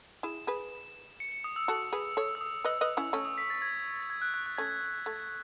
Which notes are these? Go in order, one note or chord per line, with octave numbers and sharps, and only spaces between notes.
E4 G#4 E7
G#4 B4
C#7
C#7
D#6
E6
F#4 A4
G#4 B4
A4 C#5 D#6
E6
D#6
B4 D#5 E6
B4 D#5
C#4 E4
A3 C#4 C#6
D#6
B6
A6
G#6
A6
G#6
F#6
F#6
F#6
A3 C#4 G#6
A3 G#6